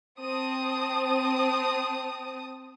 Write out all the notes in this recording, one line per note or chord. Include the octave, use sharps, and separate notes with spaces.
C4 A5 D#6